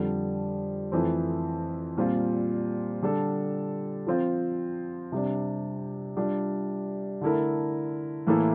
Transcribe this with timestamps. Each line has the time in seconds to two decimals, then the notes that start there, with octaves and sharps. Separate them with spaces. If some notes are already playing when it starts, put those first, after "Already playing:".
Already playing: F2 D3 G3
0.92 F2 E3 A3 C4
1.97 A#2 G3 C4 F4
3.02 D3 G3 D4 A4
4.07 F3 C4 F4 C5
5.12 C3 G3 D4
6.17 G3 D4 F4
7.21 D3 A3 E4 A#4
8.27 A2 E3 A#3 E4 A4